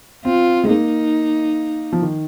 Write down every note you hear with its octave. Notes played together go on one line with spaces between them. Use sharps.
C4 F4
G#3
A#3 D#4
F3
D#3